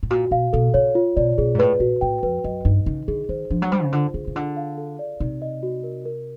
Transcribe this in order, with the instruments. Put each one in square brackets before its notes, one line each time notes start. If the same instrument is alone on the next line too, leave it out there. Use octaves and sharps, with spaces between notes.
[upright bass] A2
[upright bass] A#2 [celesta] F#4
[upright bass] B2 [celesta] F5
[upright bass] B2 [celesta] A4
[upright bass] C#3 [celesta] C#5
[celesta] F4
[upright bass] B2 [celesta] D5
[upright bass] B2 [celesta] G#4
[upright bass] G#2
[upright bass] A2 [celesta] B4
[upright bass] A#2 [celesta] F#4
[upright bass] A2 [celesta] G5
[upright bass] F2 [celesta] B4
[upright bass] F#2 [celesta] D#5
[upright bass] G2 [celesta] D#4
[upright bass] C#3 [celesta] D#4
[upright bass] D3 [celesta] G#4
[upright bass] D#3 [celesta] C5
[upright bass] F3 [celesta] D4
[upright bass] F#3
[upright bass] G3 [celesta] C5
[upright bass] C#3
[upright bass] D3 [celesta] F4
[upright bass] C#3 [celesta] G#4
[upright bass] C#3
[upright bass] D3 [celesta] F4
[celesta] F5
A4
D5
[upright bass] C3 [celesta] D#4
[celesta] D#5
F#4
A#4
A#4